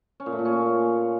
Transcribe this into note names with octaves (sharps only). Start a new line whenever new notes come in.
C#4
A#2
A3
A#2
C#4